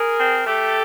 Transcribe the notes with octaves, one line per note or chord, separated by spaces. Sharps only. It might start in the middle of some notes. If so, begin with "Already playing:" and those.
Already playing: G#4 A#4
C4
A3 G4 A4